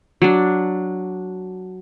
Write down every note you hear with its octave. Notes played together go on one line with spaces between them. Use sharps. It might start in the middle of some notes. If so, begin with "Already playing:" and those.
F#3 D4